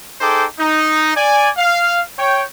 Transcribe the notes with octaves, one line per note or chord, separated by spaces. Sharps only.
D#4 G#4 A4 C5 G5 D6
D#4
D5 G#5
F5
C#5 G5